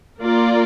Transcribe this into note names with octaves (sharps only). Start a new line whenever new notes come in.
A#3 F4 A#4 D5